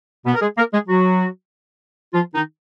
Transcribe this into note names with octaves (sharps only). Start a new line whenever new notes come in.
B2 B3
A#4
G#3 G#4
A#3 A#4
G#3 G#4
F#3 F#4
F3 F4
D#3 D#4